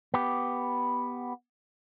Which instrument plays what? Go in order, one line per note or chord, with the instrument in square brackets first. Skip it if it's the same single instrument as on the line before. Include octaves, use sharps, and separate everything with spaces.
[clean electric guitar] B3 G4